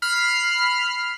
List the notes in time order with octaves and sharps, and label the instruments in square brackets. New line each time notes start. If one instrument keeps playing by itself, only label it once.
[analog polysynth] B5 F6 C7